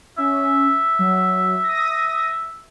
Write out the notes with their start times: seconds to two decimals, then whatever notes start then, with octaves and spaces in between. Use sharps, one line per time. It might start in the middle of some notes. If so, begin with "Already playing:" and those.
0.18 C#4 E5
0.99 F#3
1.64 D#6 A#6